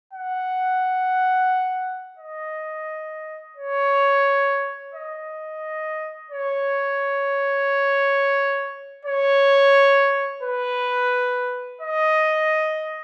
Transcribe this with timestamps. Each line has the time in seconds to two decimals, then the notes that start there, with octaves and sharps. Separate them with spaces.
0.13 F#5
2.18 D#5
3.57 C#5
4.94 D#5
6.31 C#5
9.05 C#5
10.43 B4
11.82 D#5